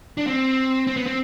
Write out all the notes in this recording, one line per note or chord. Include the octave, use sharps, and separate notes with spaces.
D4
C4
C4
B3
C4